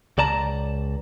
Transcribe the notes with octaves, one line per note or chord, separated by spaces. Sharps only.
C#2 D5 A5 A#5